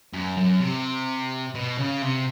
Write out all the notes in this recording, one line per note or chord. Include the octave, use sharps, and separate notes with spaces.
F#2
F#2
C3
B2
C#3
C3